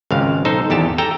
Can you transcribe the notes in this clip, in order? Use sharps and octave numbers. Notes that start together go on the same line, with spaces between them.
G#1 C#2 F5
B1 D#4 A4 C5
G#1 E2 G4 A5
A4 G5 A5 A#5